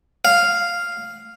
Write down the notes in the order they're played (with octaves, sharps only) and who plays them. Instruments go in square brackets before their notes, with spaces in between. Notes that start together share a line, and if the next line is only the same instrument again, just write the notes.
[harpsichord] F5